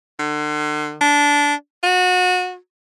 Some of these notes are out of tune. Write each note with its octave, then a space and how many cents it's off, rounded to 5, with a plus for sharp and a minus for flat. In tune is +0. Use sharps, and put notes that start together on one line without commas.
D3 +40
D4 -15
F#4 -30